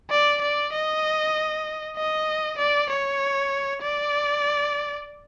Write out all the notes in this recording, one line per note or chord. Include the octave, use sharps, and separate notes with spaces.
D5
D5
D#5
D#5
D5
C#5
D5